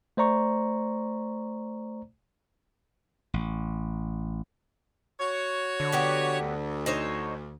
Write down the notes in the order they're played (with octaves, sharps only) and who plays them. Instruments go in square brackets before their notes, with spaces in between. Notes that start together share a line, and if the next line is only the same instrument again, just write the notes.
[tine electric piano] A3 C5 D5 A#5 C#6
[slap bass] A1
[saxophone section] F#4 C#5
[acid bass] D3
[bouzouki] F#3 B3 G4
[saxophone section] D2
[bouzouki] D#4 C5 C#5